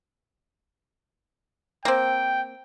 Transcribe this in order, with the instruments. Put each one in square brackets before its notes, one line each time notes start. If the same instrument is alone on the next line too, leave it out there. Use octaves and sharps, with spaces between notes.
[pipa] A#3 C4 [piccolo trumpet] G5